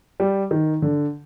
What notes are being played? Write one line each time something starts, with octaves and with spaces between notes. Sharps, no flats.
G3
D#3
D3